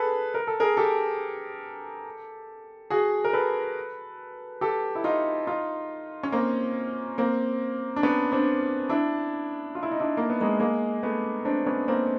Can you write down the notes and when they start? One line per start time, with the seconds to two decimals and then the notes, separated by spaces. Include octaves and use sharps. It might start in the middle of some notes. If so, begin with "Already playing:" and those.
Already playing: G#4 A4 B4
0.34 A#4
0.47 A4
0.60 G#4 A#4
0.77 G4 A4
2.90 F#4 G#4
3.24 A#4
3.33 A4 B4
4.61 G4 A4
4.95 E4
5.04 D#4 F4
5.47 D#4 F4
6.23 C#4
6.32 A#3 C4
7.18 A#3 C4
7.96 D4
8.03 B3 C#4
8.32 C4 D4
8.89 D4 E4
9.75 F4
9.83 E4
9.91 D#4
10.00 D4 E4
10.17 A#3
10.30 B3
10.41 G#3 A#3
10.60 G#3 A#3
11.03 A3 B3
11.45 C4 D4
11.66 B3 C#4
11.88 A#3 C4